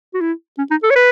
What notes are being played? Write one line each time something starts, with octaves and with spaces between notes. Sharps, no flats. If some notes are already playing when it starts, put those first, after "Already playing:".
F#4
E4
C#4
D#4
A4
C#5
B4